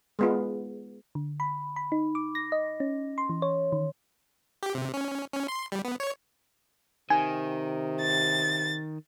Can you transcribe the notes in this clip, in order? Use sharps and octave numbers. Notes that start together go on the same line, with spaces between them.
G#3 B3 F4
D3
B5
B5
D#4
D6
A#6
D#5
C#4
C6
E3
C#5
D#3
G4
C3
C#4
C#4
C6
G3
B3
C#5
C3 D#3 G#5
A6